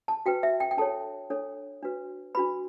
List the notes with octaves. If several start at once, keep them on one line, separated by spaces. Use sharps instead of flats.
A5
F#4 B4 G5
E5
G5
G5
D4 A4 C#5 A5
D4 A4 C#5
D4 F#4 B4
D4 F#4 B4 B5